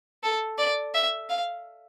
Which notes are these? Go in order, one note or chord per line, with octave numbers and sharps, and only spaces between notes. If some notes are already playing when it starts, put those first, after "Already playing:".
A4
D5
E5
F5